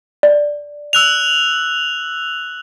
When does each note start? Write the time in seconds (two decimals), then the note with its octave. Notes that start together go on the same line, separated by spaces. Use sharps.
0.23 D5
0.93 E6 F#6 F7